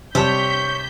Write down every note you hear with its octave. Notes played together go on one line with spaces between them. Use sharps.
C3 G3 C#5 A5 G6 B6